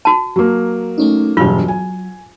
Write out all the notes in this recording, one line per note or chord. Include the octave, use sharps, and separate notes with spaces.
F#4 A5
F#3 A#3
A3 C#4 D#4
E1 G2 F#3 F4
G#5